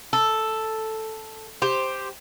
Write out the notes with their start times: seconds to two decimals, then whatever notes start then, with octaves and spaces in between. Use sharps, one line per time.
0.13 A4
1.62 G4 C5